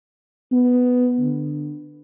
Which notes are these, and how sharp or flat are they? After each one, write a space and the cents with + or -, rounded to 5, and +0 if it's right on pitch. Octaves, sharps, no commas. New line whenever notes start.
B3 +5
D3 +15